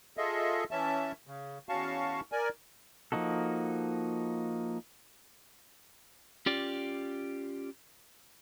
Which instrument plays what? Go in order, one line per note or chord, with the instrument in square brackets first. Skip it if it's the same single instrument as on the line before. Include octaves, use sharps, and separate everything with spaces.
[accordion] F4 G#4 A4 D#5 E5
E3 C#4 E5 A5
C#3
E2 C#4 F#4 F5 A5 C#6
A#4 D5 G#5
[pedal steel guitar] F3 A#3 D#4 F#4 A4
[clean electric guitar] C#4 F4 G4 D5